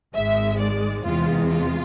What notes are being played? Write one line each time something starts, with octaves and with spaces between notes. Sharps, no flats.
G#1 G#2 G#3 E5
D5
E2 C3 E3 G#3 F4
F4